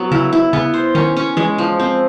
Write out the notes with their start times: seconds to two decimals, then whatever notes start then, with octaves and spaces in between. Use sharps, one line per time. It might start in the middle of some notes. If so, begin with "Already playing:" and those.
Already playing: F#3 B3
0.11 C#3 E4
0.33 E4
0.53 C#3 B3
0.74 C5
0.95 D#3 C#4
1.17 C#4
1.37 E3 G#3
1.58 F3
1.79 C4